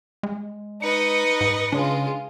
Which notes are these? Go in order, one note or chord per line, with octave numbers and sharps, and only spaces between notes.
G#3
D#4 B4 D#5 C#7
G#2
C#3 G#3 D4 F4